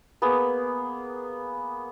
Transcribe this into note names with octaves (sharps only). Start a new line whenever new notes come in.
A#3 B3 G#4